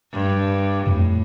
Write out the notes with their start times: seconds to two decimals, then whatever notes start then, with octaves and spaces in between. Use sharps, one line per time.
0.13 G2
0.87 F2 A2